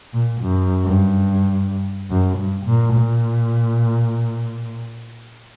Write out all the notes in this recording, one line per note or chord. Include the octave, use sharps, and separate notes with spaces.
A#2
F#2
G2
F#2
G2
A#2
A#2